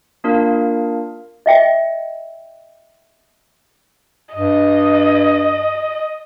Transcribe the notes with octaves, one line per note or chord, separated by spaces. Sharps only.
A#3 D4 F4 A#4 F5
D#5 E5 G5
G2 D#5